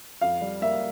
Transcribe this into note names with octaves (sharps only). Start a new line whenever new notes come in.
F2 F5
G3
A#3 E5